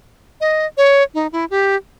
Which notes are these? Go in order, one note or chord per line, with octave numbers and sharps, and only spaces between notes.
D#5
C#5
D#4
E4
G4